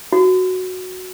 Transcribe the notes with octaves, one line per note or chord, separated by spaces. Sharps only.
F#4